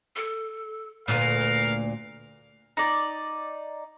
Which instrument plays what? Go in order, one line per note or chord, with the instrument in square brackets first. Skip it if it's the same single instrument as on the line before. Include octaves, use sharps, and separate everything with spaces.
[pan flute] A4
[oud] D2 A#2 [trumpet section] A#4 F5 [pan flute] B4
[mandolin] D#4 D5